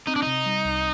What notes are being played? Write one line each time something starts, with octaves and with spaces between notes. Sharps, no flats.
C4 D#4
D4
C3 D#4
G3
C2